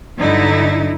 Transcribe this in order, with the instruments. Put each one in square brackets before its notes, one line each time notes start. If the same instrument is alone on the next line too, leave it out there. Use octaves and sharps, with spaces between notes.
[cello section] G2 D3 F#3 D#4 E4